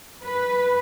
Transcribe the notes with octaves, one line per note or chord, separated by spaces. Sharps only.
B4